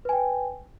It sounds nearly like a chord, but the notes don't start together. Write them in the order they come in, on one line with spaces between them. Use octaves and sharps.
B4 G#5 G5